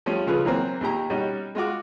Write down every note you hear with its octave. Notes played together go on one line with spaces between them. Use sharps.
F3 G3 A3 C#4 F4
C#3 F3 F4 G#4 A4 B4
E3 F#3 A#3 C4
D#2 A#2 G4 A#5
G3 C#4 D#4 F#4
G#3 F4 F#4 D6